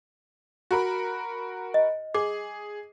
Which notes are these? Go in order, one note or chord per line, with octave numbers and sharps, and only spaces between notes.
F#4 A#4 B5
D#5
G#4 D6